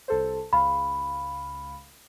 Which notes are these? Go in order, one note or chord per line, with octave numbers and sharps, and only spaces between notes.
C2 A4 C5
C#2 F5 B5